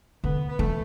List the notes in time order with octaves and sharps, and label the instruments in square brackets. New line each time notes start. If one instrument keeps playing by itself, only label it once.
[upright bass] D3 [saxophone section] B3
[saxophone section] B3
[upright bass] E3 [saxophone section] A3